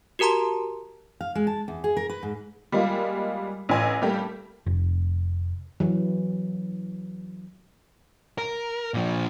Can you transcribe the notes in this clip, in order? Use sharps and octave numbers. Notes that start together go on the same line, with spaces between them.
F#4 G4 A#4 A5 A#5 C6
F5
G#3
A5
E2
G#4
A#4
B4
G#2
G3 G#3 A#3 F4
A1 B4 G#5
G3 A3 A#3 G4
F1
E3 F#3
A#4
A#2 F3